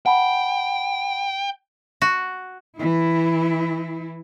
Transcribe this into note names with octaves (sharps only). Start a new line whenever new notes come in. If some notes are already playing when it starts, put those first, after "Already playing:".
F#5 G5 A5 B5
F#4
E3 E4